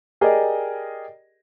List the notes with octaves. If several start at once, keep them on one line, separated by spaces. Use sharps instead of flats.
G4 G#4 A#4 D5 D#5